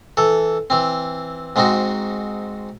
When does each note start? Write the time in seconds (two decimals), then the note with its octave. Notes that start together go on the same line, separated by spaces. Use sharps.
0.17 E3 A4
0.70 E3 C4
1.56 G#2 G#3 C4 D#4 F#4